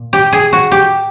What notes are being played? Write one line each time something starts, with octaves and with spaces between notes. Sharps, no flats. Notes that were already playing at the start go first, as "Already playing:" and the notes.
Already playing: A#2
G4
G#4
F#4
G4